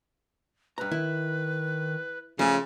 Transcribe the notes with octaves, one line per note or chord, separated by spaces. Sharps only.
G2 B4 A#5
D#3 E4
C#3 F3 A3 C#4